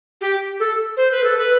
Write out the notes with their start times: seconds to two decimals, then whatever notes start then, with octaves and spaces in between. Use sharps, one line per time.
0.21 G4
0.60 A4
0.97 C5
1.11 B4
1.24 A4
1.38 B4